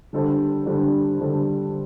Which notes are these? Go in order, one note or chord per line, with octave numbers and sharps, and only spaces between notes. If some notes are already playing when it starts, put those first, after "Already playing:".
D3 G3 D4 A4 C5
D3 G3 D4 A4 C5
D3 G3 D4 A4 C5